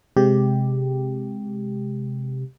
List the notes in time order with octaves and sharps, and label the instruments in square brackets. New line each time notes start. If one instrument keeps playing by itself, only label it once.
[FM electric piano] C3 G#3 G4